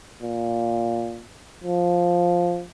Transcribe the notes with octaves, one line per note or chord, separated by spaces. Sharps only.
A#2
F3